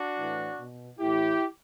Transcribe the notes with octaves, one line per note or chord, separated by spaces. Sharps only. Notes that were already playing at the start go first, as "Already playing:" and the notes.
Already playing: D4 F#4
A2 E3
B2
A2 E3 E4 G4